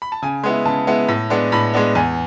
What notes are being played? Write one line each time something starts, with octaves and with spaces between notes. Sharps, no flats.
B5
A5
C#3 G#5
G#3 B3 E4
C#3 A5
G#3 B3 E4
A2
G#3 B3 D4
A2 B5
G#3 B3 D4
E2 G#5